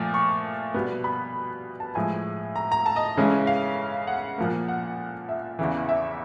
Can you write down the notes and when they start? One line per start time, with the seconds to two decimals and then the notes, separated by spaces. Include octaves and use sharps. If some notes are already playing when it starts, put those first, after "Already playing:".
Already playing: A#2 F3 A3 D6
0.14 C#6
0.74 B2 G3 B3
1.04 B5
1.80 A5
1.95 A2 F3 G#3 G#5
2.56 A#5
2.72 A#5
2.86 A5
2.96 D#5
3.17 C#3 E3 G#3 C#4
3.47 F5
4.07 F#5
4.38 A#2 F3 A#3
4.68 F#5
5.29 E5
5.59 E2 C#3 E3
5.89 E5